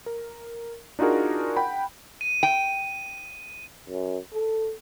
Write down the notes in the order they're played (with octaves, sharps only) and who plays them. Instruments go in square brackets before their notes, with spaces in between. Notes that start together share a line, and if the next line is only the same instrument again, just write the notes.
[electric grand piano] A#4
D4 D#4 F4 F#4 G#4 A#4
F#5 G5 B5
[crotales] D#7
[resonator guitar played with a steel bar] G5
[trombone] F#2
A4